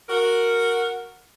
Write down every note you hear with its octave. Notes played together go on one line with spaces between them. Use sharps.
F#4 A#4